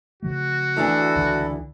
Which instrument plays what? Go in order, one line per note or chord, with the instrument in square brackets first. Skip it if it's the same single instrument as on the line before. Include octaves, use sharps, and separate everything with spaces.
[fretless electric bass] C#3 F3 A3 [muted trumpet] F#4
[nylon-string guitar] D2 E3 D4 [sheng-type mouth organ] E4 A4
[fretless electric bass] C#2 D3